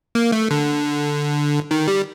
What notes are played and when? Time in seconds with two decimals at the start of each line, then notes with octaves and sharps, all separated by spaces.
0.15 A#3
0.32 A3
0.51 D3
1.71 D#3
1.88 G3